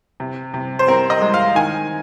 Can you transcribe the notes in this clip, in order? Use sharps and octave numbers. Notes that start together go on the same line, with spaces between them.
C3
C3
C5
C4 A#4
D#5
G#3
F5
D#3 G#5